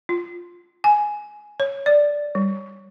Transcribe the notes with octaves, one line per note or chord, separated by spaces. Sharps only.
F4
G#5
C#5
D5
G3